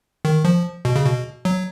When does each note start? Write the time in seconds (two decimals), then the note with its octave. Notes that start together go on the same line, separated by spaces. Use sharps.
0.25 D#3
0.45 F3
0.85 B2
0.96 C#3
1.05 B2
1.45 F#3